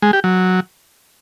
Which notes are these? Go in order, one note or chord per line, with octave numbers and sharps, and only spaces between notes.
G#3
G4
F#3